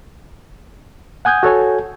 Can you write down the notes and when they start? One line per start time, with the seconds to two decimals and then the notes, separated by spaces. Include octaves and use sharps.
1.25 F#5 G#5 D#6 G6 G#6
1.43 F#4 A4 C#5 G#5